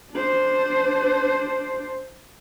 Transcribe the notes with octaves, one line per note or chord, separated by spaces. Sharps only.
D4 C5